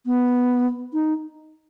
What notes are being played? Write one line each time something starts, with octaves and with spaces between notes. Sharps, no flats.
B3
D#4